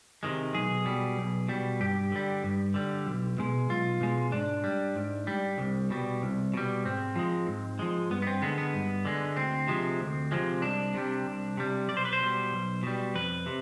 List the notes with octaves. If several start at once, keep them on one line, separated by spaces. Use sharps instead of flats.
C3 D#3 G#3
B1 G#4
B2 G3
B1
B2 G3
G2 G4
D3 G3
G2
D3 G3
B1
B2 G#3
B1 F4
B2 G#3
G#2 D4
G3
G#2
G3
C2
B2 G3
C2
B2 G3
G#2 C4
F3 G#3
G#2
F3 G#3
G2 B3
B3
C4
D3 G#3 B3
B3
G2
D3 G#3
D2 C4
C3 F3 G#3
D2
C3 F3 G#3
C2 D4
C3 G3
C2
C3 G3
B1 D5
C5
B4
C5
B2 G3
B1
B2 G3
F2 B4
C3